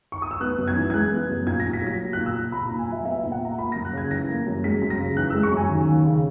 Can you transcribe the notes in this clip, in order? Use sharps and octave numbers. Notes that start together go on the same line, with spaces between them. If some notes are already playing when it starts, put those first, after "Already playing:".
C#6
D#6
E6
B3 F#6
F#2
G#6
E3
G#6
G#3 F#6
B3
F#2
A#2 G#6
A#6
A#2
B6
F#3 A#6
A#3
F#6
A#2
E6
A#2
A#2 B5
A#5
A#2
G#5
F#3 E5
B3 E5
E5
A#2
F#5
A#2 A#5
A#3 B5
A#6
F#2
F#6
C#3 G#6
E3 A#6
A#3
F#2
G#3 B6
F#2
A#6
C#3
E3 F#6
E6
G#3
C#6
F#2
G#5
D#2
D#2
C#3